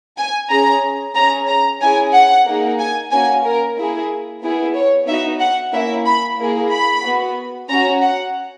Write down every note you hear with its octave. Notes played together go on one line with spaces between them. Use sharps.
G#5
C#4 G#4 A#5
C#4 G#4 A#5
A#5
C#4 E4 G#4 G#5
F#5
A#3 D#4 G#4
G#5
A#3 C#4 F#4 G#5
A#4
A#3 E4 G#4
B3 E4 G#4
C#5
B3 D#4 F#4 E5
F#5
A#3 C#4 E4 E5
B5
A#3 E4 G#4
B5
B3 F#4
C#4 F#4 A#5
F#5